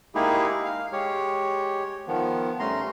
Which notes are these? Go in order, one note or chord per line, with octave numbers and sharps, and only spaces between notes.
G#3 A#3 D#4 E4 G4 G#4
F5
G#3 G4 C#5
D#3 F3 B3
G2 A3 C#4 A#5 C6